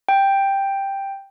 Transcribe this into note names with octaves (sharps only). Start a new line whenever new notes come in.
G5